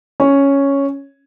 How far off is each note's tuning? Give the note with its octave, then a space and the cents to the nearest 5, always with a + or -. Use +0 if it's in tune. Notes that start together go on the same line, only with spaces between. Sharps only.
C#4 +0 C#5 +0